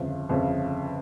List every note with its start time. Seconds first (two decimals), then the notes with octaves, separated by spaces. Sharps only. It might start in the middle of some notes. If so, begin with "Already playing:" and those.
Already playing: G1 F2 C#3
0.29 G1 F2 C#3